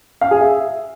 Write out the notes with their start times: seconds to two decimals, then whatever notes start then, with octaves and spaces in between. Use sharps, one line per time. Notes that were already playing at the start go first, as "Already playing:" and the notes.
0.21 F5
0.31 G#4
0.41 E5